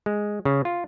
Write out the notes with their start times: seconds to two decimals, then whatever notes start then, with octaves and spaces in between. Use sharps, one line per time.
0.06 G#3
0.45 C#3
0.65 F4